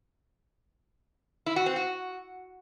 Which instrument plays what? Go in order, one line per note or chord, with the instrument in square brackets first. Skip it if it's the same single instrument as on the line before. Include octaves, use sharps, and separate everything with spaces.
[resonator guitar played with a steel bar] E4
F#4
C4
F#4